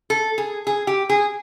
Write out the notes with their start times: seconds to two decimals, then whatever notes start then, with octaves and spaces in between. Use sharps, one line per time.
0.10 A4
0.38 G#4
0.67 G#4
0.87 G4
1.09 G#4